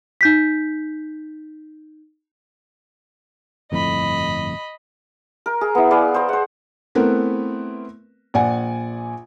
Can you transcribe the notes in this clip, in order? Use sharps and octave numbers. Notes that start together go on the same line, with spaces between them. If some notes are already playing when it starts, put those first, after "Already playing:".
D#4 G6 B6
G1 F2 A2 D#5 B5
A#4
G#4
B3 E4
G#4 B4 D5 F5
C5 A#5
C5 F#5
A3 B3 C4 E4 A#4 B4
A#1 D5 F#5 G#5